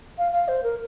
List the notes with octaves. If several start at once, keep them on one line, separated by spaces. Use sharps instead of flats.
F5
F5
C5
A#4